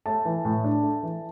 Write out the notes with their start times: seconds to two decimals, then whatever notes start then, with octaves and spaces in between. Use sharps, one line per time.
0.06 A3 A5
0.25 E3
0.45 A2
0.64 D4
0.83 A3
1.03 E3